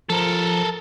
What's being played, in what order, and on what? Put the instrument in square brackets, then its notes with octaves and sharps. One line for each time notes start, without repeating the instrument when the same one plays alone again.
[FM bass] F3 [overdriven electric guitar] A4 A#4